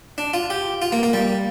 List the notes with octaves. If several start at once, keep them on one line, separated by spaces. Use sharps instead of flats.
D4
F4
G4
F4
A#3
A#3
G3